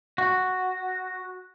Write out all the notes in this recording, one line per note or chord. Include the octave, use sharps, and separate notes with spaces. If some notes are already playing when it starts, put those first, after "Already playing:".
F#4